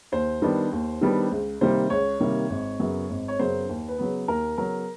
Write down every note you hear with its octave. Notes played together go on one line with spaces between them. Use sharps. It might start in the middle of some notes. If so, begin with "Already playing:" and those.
D#2 C5
D#3 G3 B3 D4
D#2
D#3 G3 B3 D4
C#2
C3 D#3 G3 A#3 C5
C#2 C#5
C3 D#3 G3 A#3
G#1
F#2 C#3 F#3 B3
G#1
C#5
F#2 C#3 F#3 B3 C5
D#2
B4
C#3 F#3 B3
D#2 A#4
C#3 F#3 B3 A#4